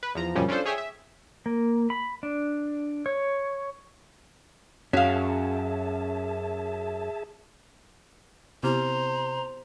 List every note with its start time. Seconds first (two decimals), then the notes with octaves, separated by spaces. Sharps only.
0.03 B4
0.15 E2 F3 A#5
0.35 F#2 A#2 C#3 F3 G3 C#4
0.49 C#4 D4 F4 A4 C5
0.65 G#4 C#5 E5 G5 G#5 D#6
0.78 E5
1.46 A#3
1.90 B5
2.23 D4
3.06 C#5
4.93 F#2 C#4 F#4 G#4 E5 F5 A5
8.63 C3 B3 E4 G4 C5 A#5